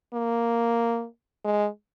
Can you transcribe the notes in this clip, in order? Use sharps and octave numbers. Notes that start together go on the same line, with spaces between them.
A#3
G#3